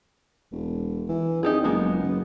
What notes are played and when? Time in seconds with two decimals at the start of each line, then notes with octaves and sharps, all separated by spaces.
0.52 E1
1.09 E3
1.43 F2 D#4 G4 G#4
1.64 F#1 G#3 A#3 B3
2.03 F#1